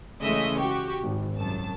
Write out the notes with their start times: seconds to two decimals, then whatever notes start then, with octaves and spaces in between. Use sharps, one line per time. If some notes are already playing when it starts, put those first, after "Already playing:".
0.21 C#3 E3 G#3 A3 D#5 E5
0.57 F#4 G4 C#6
1.01 G#1
1.38 C2 F#2 A5